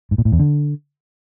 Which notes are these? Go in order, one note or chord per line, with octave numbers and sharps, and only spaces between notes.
G#2
A#2
A2
E2
D3